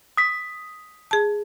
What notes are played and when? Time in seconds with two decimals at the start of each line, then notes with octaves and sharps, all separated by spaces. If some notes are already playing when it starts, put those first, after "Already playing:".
0.17 D#6 B6
1.11 G#4 A5